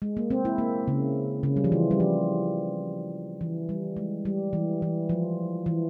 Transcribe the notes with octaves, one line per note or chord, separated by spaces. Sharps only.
G#3
A#3
C4
E4
A#3
C#3
C#3
G3
F3
E3
G3
F3
E3
G3
G#3
G3
E3
E3
F3
E3